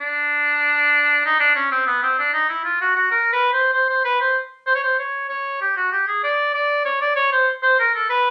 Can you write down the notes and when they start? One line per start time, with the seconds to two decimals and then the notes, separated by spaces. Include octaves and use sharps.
0.01 D4
1.25 D#4
1.40 D4
1.55 C#4
1.71 C4
1.87 B3
2.03 C4
2.19 D4
2.33 D#4
2.49 E4
2.64 F4
2.81 F#4
2.96 F#4
3.11 A#4
3.33 B4
3.53 C5
3.74 C5
3.90 C5
4.05 B4
4.21 C5
4.67 C5
4.75 C#5
4.83 C5
4.99 C#5
5.29 C#5
5.61 G4
5.77 F#4
5.92 G4
6.08 G#4
6.24 D5
6.54 D5
6.85 C#5
7.01 D5
7.16 C#5
7.32 C5
7.63 C5
7.79 A#4
7.95 A4
8.10 B4